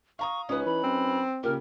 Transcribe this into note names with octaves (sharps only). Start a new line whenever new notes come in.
F5 A#5 C#6 D#6
C#2 C#4 D#4 B4 D#6
E3 B5
F#2 C4
A#2 C#3 G4 A#4